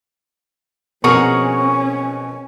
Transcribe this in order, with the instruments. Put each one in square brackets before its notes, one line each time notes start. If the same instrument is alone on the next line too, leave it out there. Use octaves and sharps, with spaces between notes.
[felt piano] B2 F3 C4 [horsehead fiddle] C#4 [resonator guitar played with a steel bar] G#4 A#4 F#5 [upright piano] C#6